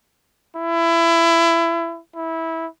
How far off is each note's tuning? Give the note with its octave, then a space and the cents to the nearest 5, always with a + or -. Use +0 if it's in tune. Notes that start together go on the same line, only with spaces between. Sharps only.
E4 +25
E4 -15